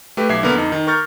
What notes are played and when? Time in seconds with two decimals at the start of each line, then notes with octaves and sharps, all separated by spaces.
0.17 A3 G4 B4
0.29 B1 E5 D6 G#6 C7
0.43 D3 A#3 B3 A#4
0.55 F2 D#4
0.72 D#3
0.87 A#4 C#6 F6 G6 A6